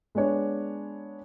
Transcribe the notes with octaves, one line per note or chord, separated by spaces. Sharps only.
G#3 B3 D4 C#5